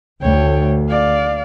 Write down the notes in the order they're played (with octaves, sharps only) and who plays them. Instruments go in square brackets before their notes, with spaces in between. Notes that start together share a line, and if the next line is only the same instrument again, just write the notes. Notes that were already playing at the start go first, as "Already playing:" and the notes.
[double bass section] D2 [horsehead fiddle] C#5 G5
[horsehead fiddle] D5 F5